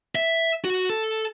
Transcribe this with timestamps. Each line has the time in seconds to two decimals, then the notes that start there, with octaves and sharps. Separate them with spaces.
0.15 E5
0.65 F#4
0.89 A4